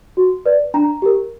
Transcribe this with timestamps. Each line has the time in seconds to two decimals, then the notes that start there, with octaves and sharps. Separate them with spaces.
0.17 F#4
0.46 B4 D5
0.74 D4 A#5
1.02 G4 A#4